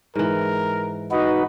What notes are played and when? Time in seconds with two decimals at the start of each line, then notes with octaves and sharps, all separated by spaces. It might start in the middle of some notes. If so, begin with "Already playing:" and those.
0.15 G#2 E3 A#4
1.11 D#4 F#4 B4 D#5